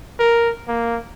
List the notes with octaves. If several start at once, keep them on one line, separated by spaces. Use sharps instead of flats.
A#4
A#3